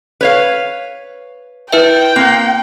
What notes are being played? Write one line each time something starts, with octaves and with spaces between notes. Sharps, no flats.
B4 C#5 F5
E4 B4 E5 G5
A#3 C4 F#6